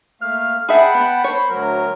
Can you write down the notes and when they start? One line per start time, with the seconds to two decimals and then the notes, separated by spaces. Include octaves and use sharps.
0.21 A3 A#3 F5 F6
0.69 G#4 E5 F#5 G5 A5 B5
0.94 B3
1.24 C5 C#5
1.49 D2 F#3 A#4